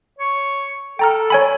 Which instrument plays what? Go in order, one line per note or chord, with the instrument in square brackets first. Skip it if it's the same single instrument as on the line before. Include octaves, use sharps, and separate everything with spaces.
[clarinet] C#5
[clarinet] A4 [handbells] G5 A#5 F6
[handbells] C#5 G#5 B5